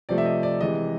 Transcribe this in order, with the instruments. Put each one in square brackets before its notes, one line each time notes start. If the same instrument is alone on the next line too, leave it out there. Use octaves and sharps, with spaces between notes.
[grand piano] C3 F3 A3 D5
E5
D#5
D5
C3 E3 G#3 D#5